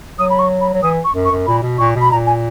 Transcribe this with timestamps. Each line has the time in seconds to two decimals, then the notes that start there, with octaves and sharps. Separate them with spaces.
0.19 F#3 D#6
0.30 B5
0.39 C#6
0.61 B5
0.74 F#3
0.83 E3 D#6
1.05 C#6
1.15 F#2
1.25 C#6
1.31 F#2
1.47 A#2 B5
1.62 B2
1.78 A#2 C#6
1.96 B2
2.01 B5
2.11 A#2 A#5
2.27 G#5